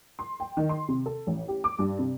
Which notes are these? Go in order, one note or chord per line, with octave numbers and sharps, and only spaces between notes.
C6
G5
D#3
C6
C3
A4
A1
G4
D6
G2
C3